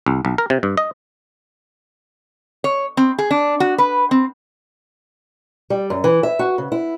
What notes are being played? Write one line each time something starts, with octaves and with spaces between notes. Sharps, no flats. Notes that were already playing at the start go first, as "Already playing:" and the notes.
C2
B1
A#4
C3
G2
D#5
C#5
C4
G#4
D4
F#4
B4
C4
G3
F#2
E3
E5
F#4
C#3
E4